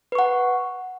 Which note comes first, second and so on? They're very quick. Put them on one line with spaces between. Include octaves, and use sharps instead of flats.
B4 C#6 F#5